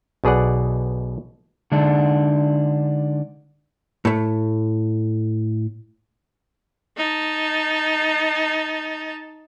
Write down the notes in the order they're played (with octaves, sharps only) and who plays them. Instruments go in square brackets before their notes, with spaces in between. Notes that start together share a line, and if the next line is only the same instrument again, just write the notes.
[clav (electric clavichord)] B1 B2 G#4 D5 F#5
[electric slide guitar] D3 G#3 D4 D#4
[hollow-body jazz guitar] A2 A3
[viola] D#4 A5